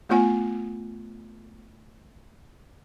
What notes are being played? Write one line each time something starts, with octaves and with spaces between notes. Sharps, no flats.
A3 B3 F4 F#5 G#5